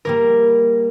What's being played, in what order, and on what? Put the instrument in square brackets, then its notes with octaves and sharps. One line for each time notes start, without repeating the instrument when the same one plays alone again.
[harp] G3 A#3 A#4